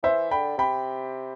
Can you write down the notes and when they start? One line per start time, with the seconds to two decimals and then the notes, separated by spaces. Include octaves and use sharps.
0.03 E3 C5 E5
0.31 D3 G5 B5
0.58 C3 G5 B5